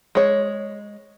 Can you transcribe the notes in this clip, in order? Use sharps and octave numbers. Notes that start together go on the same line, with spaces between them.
G#3 C#5